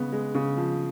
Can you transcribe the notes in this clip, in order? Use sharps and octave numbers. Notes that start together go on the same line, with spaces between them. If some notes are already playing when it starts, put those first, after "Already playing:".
Already playing: C#3 G#3 B3
G#3
C#3
F3